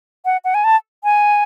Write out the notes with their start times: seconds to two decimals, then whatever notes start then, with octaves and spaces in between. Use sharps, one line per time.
0.25 F#5
0.44 F#5
0.54 G#5
0.64 A5
1.04 G#5